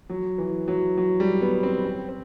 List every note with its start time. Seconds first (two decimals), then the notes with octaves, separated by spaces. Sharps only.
0.10 F#3
0.38 E3
0.68 F#3
0.98 F#3
1.20 G3
1.42 B3
1.63 C4
1.85 C4
2.09 C4